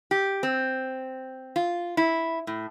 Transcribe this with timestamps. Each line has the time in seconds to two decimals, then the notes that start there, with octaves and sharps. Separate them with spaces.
0.11 G4
0.43 C4
1.56 F4
1.97 E4
2.47 A2